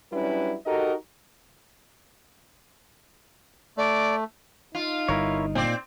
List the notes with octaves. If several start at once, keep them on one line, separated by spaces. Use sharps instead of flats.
F#3 G3 C#4 D4 E4 B4
D#4 F#4 G4 A4 A#4 D#5
A3 D5
D#4 F4
G1 G2 E4 A#4 C#5
A#2 C4 D5